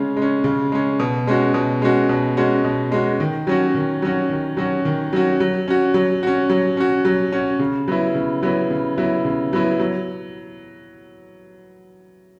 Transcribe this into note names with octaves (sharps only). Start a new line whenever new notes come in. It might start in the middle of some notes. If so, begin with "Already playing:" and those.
Already playing: C#3 G#3 C#4
G#3
C#4
C#3
G#3 C#4
B2
G#3 C#4 F#4
B2
G#3 C#4 F#4
B2
G#3 C#4 F#4
B2
G#3 C#4 F#4
D#3
F#3 C#4 F#4
D#3
F#3 C#4 F#4
D#3
F#3 C#4 F#4
D#3
F#3 C#4 F#4
F#3
C#4 F#4
F#3
C#4 F#4
F#3
C#4 F#4
F#3
C#4 F#4
C#3
F#3 B3 E4
C#3
F#3 B3 E4
C#3
F#3 B3 E4
C#3
F#3 B3 E4
F#3